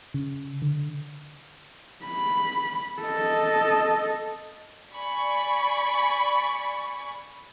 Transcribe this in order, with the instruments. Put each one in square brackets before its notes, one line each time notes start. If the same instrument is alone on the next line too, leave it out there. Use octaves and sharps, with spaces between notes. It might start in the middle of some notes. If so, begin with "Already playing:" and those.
[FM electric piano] C#3
D3
[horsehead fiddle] B5
A4 D#5
[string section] D5 G#5 B5 C#6